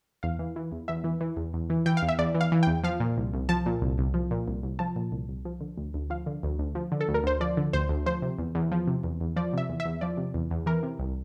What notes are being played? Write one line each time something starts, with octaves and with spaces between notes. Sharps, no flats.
E2 F5
E3
E3
E2
E2 E5
E3
E3
E2
E2
E3
E3 G5
F5
E2
E5
E2 D5
E3
F5
E3
E2 G5
F3 F5
A#2
C2
C2
F3 A5
A#2
C2
C2
F3
A#2
C2
C2
F3 A5
A#2
C2
C2
F3
D3
D2
D2
F3 F5
D3
D2
D2
F3
D3
A4
D2
A#4
D2 C5
F3 D5
D3
D2 C5
D2
F3 C5
C3
E2
E2
F3
C3
E2
E2
F3 D5
C3 E5
E2
E5
E2
F3 D5
C3
E2
E2
E3 A#4
C3
C2